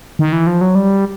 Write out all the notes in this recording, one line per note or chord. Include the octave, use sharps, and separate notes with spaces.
D#3
E3
F3
F#3
G3